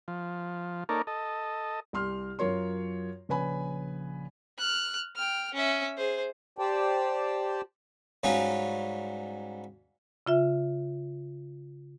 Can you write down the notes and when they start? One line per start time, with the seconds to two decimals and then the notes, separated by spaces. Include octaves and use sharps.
0.08 F3
0.89 A#3 D#4 A4 A#4 C#5 D5
1.07 A4 D#5
1.93 C2 G4 C6 F6
2.39 F#2 F4 A#4 C#5 C6
3.29 A#1 C#3 B4 G#5 B5
4.58 F6 F#6
5.16 G5 F6
5.54 C#4 E5
5.97 G#4 C5
6.59 G4 C5 D5 G5 A5
8.23 G#2 F#3 G3 C#4 F4
10.27 C#3 F4 E5